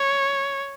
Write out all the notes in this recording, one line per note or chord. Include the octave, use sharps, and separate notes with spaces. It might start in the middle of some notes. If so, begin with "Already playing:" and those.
Already playing: C#5